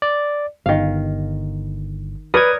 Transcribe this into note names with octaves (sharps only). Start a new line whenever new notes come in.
D5
G1 D#3 F5
A#4 B4 C#5 D5 D#6 G#6